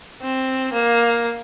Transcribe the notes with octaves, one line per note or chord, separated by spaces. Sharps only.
C4
A#3